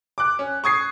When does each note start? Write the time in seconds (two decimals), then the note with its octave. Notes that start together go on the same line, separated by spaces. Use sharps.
0.18 D6 F#6
0.39 C#4
0.64 C#6 D#6 G#6 C7